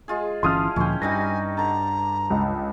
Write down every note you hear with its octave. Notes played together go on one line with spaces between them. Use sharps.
G#3 F4 G#4
G1 E3 F3 C#4 E4 C6 D#6 F6
D2 A#2 F3 C#4 G5
G2 G3 D#4 B4 G#5 A#6
D3 A5 A#5
C#2